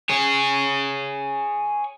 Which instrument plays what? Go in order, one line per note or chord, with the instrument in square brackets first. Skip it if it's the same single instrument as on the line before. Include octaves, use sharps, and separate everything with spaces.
[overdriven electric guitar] G#4 C#5